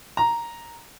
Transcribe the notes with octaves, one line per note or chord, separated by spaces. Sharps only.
A#5